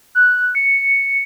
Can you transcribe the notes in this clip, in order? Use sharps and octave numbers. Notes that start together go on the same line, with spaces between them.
F#6
C#7